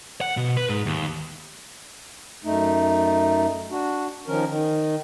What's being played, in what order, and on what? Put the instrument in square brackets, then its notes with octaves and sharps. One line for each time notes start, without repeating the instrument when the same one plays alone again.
[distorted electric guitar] F#5
B2
B4
G#2
D#2
[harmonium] F#2 A3 D#4
D4 F#4
D#3 F3 C#4 A#4
D#3